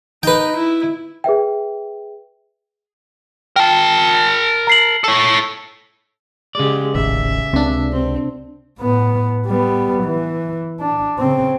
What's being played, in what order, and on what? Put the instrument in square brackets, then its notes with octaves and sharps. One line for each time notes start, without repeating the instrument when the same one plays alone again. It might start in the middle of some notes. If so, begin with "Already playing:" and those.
[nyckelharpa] D#4 [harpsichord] B4 G5
[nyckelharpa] E4
[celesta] G#4 B4 E5 G5
[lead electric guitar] A#4 A5 [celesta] G5
[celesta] A#5 C7 F#7
[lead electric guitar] A4 C#5
[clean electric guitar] C#3 D5 [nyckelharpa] G#3 G4
[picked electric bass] D#1 A1 D#2 [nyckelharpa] E5
[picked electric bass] C#2 [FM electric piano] C3 D4
[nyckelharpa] C4
[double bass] A2 B3
G3 B3
E3
D4
C#3 C4